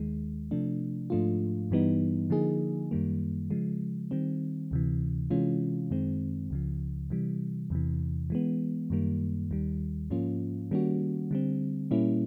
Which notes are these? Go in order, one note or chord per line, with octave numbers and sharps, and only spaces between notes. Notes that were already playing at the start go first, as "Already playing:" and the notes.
Already playing: D#2 D#3 G#3
C3 F3 A3 D4
G#2 F3 A3 D4 F4
G2 E3 G3 B3 D#4
D3 F3 A#3 D#4 G#4
F#2 D#3 G3 A#3
C#3 F3 G#3
D#3 G3 C4
D2 C3 E3
C3 E3 G#3 C#4 F4
F#2 D#3 G#3 C4
C#2 C#3 F3
C3 E3 G3
E2 C3 E3
E3 G#3 B3
F#2 D#3 G3 A#3
D#2 D#3 G3
G#2 F3 A#3 C#4 F4
D#3 G3 A#3 C#4 F#4
D3 G3 C4
A#2 G3 A#3 C#4 E4